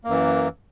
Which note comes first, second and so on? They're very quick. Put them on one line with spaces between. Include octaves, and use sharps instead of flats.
A#3 F#2 E3